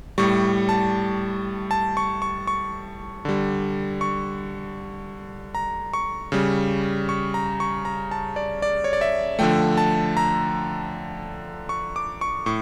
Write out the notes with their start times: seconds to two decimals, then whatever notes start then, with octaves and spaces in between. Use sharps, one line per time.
0.18 A2 G3 C#6
0.69 A5
1.71 A5
1.97 C#6
2.22 C#6
2.47 C#6
3.25 D3 G3
4.01 C#6
5.55 A#5
5.94 C#6
6.32 C#3 G3
7.09 C#6
7.34 A#5
7.60 C#6
7.85 A#5
8.11 A5
8.36 D5
8.62 D5
8.84 C#5
8.93 D5
9.01 E5
9.39 D3 F3 A3 G5
9.77 A5
10.17 A#5
11.69 C#6
11.96 D6
12.21 C#6
12.46 A2 C#6